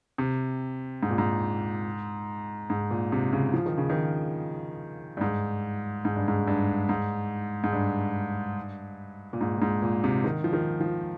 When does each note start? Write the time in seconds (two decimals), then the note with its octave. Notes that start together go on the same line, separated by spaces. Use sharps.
0.18 C3
1.03 G#2
1.10 A#2
1.18 G#2
2.70 G#2
2.91 A#2
3.12 C3
3.33 C#3
3.54 F3
3.66 D#3
3.78 C#3
3.90 D#3
5.17 G2
5.21 G#2
6.05 G#2
6.16 G2
6.28 G#2
6.48 G2
6.89 G#2
7.64 G#2
7.73 G2
9.33 A#2
9.41 G#2
9.57 A#2
9.62 G#2
9.82 A#2
10.04 C3
10.24 D#3
10.44 F3
10.53 D#3
10.81 F3